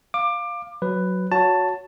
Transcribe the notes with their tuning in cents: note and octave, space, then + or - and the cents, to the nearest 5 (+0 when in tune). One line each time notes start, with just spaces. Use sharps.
F5 +0 D6 +20
F#3 +0 B4 +10
F#4 -15 C#5 +20 A5 +10